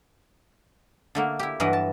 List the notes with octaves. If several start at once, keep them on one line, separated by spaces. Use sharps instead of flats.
D3 A3 A#3
E4 G4
G2 E3 F#3 B4 D#5
A5